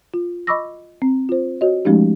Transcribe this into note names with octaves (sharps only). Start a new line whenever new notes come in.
F4
D#5 B5 C#6 D6 E6 A#6
C4
F4 C5
F#4 C#5 D#5
F3 G#3 A3 C#4 D#4 G4